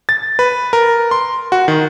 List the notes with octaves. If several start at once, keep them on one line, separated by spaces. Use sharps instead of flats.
A6
B4
A#4
C6
F#4
D#3